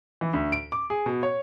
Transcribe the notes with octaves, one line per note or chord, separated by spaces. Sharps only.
E3
D2
D7
D6
G#4
B2
C#5